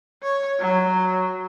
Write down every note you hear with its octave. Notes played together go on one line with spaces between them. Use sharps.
C#5
F#3